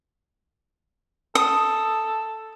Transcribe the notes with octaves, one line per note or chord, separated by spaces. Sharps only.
A4 D#6